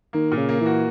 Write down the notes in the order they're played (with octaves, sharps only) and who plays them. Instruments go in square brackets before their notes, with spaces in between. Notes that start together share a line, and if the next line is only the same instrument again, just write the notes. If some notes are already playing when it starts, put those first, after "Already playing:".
[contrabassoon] D#3 [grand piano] A#3
[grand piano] A#2
[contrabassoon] C#3
[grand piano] A#3
[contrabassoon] E3
[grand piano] F#4